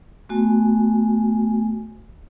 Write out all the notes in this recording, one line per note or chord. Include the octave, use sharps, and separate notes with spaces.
A3 B3 F#4 G#5